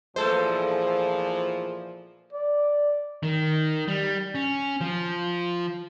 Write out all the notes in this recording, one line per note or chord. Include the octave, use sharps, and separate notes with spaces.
A#2 E3 F3 G#3 A3 B3 A4 C5
D5
D#3
G3
C#4
F3